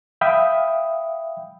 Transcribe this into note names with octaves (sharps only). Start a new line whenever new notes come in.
E5 F5 G5 B5 D#6